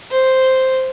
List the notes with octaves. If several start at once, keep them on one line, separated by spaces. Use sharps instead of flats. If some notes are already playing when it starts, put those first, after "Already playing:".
C5